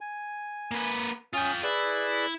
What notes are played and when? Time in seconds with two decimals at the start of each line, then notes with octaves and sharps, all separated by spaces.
0.01 G#5
0.71 A#3 B4
1.33 C#4 F4 G5 D#6
1.63 E4 G#4 B4 D5